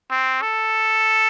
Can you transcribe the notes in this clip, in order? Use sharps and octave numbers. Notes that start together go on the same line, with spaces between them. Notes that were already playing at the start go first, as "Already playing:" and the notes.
C4
A4